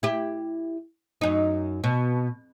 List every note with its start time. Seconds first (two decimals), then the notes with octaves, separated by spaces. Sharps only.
0.03 E4 G4
1.21 F#2 D#4
1.84 B2